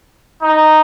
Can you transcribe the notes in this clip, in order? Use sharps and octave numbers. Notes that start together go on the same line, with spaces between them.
D#4